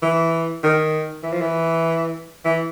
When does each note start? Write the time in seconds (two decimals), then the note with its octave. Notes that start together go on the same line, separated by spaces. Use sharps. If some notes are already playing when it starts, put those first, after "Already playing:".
0.02 E3
0.63 D#3
1.23 E3
1.33 F3
1.41 E3
2.45 E3